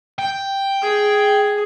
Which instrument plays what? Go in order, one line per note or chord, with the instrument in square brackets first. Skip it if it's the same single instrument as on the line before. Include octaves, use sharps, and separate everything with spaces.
[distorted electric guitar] G5
[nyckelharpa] G#4